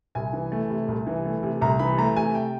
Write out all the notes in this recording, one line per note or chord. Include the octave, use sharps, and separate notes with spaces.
C2 G#5
E3
A3
C3
C2
E3
A3
C3
C2 A#5
E3 B5
A3 A#5
C3 G#5
G5